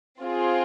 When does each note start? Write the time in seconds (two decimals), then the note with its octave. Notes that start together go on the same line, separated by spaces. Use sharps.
0.22 C4 F4 G#4